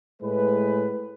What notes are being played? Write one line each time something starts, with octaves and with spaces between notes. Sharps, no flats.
A2 G#3 B4